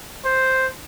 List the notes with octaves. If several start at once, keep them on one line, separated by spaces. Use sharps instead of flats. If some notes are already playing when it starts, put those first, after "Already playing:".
C5